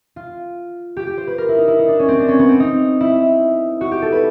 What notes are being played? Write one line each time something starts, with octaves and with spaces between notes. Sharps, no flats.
F4
G4
G4
C5
B4
A#4
E4
D#4
E4
D#4
D4
C#4
C4
D4
C#4
B3
C4
D#4
E4
F#4
G4
A4
B4